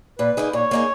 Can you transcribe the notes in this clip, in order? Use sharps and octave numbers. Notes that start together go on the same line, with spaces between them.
A#2 B4
A#3 D#4 G#4
A#2 C#5
A#3 D#4 G#4